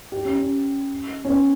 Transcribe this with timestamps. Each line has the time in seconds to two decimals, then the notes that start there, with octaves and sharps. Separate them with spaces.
0.12 G4
0.25 C#4
0.38 C#4
1.25 C#4
1.29 B3